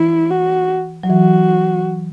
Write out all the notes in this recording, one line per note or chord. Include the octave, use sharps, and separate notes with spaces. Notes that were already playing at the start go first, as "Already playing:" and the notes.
Already playing: E3 E4
F#4
F#3
E3 F#4